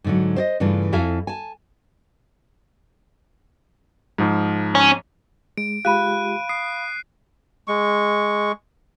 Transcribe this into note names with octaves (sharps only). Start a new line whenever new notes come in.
G#2 D3 F#3
C5 D5 D#5
G2 C#3 E3 A3 D4 F4
F2 E4 A4 F5 G#5
G#5 A5
G#2 F3
C#4
G#3 D7
G#3 F4 G4 F5 B5 F#6 D#7
D#6 C7
G#3 C#6